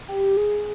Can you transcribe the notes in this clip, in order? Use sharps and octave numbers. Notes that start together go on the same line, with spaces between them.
G4
G#4